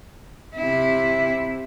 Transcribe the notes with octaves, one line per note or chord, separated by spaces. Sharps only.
C3 E4